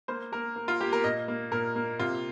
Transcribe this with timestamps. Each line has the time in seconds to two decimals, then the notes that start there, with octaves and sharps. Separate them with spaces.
0.08 A#3 C5
0.32 A#3 A#4
0.56 A#3
0.68 F4
0.80 A#3 G4
0.93 A#4
1.04 A#2 D#5
1.28 A#3
1.51 A#2 A#4
1.76 A#3
1.99 C3 F4